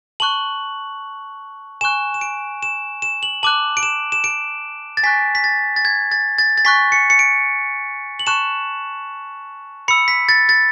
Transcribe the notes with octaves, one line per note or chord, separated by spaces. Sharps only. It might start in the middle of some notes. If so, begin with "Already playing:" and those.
A5 C#6 F#6 F#7
G#5 C#6 F#6 E7
E7
D7
E7
E7
F#7
A5 D6 F#6 F#7
D7
E7
E7
D7
A6
G#5 C#6 F#6 B6
B6
A6
A6
G#6
A6
A6
A6
G#5 C#6 F#6 B6
C#7
C#7
D7
F#7
A5 C#6 F#6 E7
B5 E6 C#7
B6
A6
A6